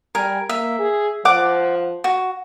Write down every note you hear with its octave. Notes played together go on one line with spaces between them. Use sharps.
G3 A#4 G#5
A#3 E5
G#4
F3 D5 F#5 D6
F#4